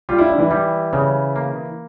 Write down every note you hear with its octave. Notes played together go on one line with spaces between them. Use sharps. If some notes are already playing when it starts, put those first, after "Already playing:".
G3 F4
E4
D4
E3 E4
G3
C#3
A#3